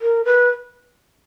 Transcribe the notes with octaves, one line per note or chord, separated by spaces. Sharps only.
A#4
B4